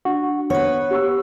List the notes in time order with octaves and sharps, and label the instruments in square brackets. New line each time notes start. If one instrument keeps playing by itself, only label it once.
[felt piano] D4 [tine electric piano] F#4
[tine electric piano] B3 [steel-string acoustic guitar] B4 C#5
[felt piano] G4 C#6 E6